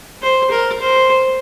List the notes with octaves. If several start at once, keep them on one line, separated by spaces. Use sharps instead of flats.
C5
A#4
C5